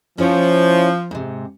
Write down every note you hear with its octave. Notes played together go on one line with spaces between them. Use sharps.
F3 C#4 E4 C#5
G#2 C3